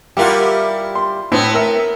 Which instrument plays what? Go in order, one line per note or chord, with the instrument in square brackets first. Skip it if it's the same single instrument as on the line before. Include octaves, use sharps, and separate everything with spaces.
[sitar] G3 E4 F4 [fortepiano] G4 A#4 F#5
[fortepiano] C6
[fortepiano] A2 [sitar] B3 C4
[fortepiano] A#4 E5